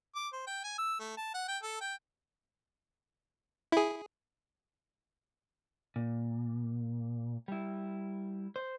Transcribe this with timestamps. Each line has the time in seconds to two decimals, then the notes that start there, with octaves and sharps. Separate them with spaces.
0.15 D6
0.33 C5
0.47 G5
0.64 G#5
0.78 E6
1.00 A3
1.17 A5
1.34 F#5
1.48 G5
1.63 A4
1.81 G5
3.72 E4 G#4
5.96 A#2
7.48 G3 E4
8.56 C5